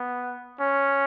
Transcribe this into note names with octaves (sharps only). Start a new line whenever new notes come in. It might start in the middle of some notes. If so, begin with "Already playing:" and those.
Already playing: B3
C#4